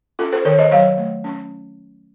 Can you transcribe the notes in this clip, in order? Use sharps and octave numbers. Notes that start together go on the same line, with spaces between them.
C#4 F4 A4
A4 C5
D#3 A#4 C#5
C5 D#5
F#3 C#5 F5
A3
C#4